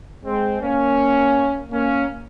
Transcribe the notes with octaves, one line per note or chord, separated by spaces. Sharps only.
G#3 C4
A#3 C#4
A#3 C#4